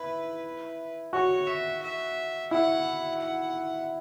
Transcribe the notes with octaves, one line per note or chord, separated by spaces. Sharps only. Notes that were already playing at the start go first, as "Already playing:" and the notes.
Already playing: E4 B4
F#4 C#5
E5
E5
E4 F#5
F#5